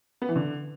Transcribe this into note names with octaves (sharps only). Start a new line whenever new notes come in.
B3
E3
D3